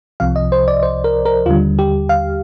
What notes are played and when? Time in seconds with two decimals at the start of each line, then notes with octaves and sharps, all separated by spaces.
0.20 C2 C3 F3 F5
0.36 D#5
0.52 C5
0.68 D5
0.83 C5
1.04 A#4
1.25 A#4
1.46 D#2 D3 G3 F4
1.79 G4
2.09 F5